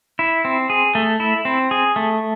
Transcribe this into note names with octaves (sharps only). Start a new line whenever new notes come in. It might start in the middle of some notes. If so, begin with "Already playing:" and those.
E4
C4
G#4
A3
E4
C4
G#4
A3